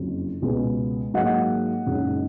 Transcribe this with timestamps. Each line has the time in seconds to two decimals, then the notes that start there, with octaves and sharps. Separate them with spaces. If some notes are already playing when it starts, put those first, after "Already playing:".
Already playing: F#1 F2 C#3 F#3
0.42 C#2 B2 G#3 B3
1.14 G#2 F#3 A#3 D#5 F#5
1.86 F#1 F#2 C#3 G#3 D#4